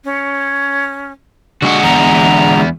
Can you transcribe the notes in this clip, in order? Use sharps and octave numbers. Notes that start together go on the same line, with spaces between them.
C#4
D3 G#3 F#4 F#5
E2 B3 A#5